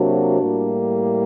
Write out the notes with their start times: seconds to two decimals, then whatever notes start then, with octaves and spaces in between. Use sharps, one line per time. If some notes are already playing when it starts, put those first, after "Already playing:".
Already playing: C3 F#3 A#3 D4 F#4
0.39 A2 G3 A#3